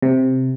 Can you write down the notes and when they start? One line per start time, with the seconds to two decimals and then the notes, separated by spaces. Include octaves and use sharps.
0.02 C3